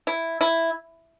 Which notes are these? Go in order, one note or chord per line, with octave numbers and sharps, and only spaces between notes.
E4
E4